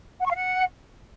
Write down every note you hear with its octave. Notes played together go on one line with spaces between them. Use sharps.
F#5
C#6
F5
F#5